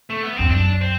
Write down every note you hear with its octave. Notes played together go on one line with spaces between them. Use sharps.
A3
B3
E2 C4
F#2 D4
C4